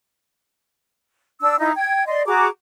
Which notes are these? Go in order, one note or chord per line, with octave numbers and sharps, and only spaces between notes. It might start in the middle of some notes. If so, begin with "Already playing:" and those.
D4 E6
D#4 E4 D#5
G5 G#6
D5 D#5 C6
F#4 G#4 A#5 D6